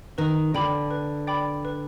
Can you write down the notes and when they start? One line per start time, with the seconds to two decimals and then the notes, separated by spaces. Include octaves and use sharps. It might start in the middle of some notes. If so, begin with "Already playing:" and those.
0.18 D#3 B4
0.54 D3 D5 G5 B5 D6
0.91 B4
1.27 D5 G5 B5 D6
1.65 B4